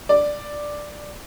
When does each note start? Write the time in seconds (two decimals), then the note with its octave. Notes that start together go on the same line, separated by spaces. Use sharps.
0.09 D5